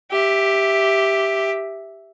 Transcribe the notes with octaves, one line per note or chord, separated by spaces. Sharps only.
G4 E5